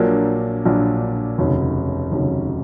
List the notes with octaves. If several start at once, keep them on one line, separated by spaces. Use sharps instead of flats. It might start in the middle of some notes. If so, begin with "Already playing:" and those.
Already playing: A#1 A#2 F#3 A#3 D4
A#1 A#2 F#3 A#3 D4
F1 D#2 C#3 F#3
F1 D#2 C#3 F#3